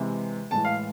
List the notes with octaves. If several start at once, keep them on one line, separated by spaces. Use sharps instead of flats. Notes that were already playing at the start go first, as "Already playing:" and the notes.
Already playing: C3 E3 G#3
A2 E3 G#3 A5
F5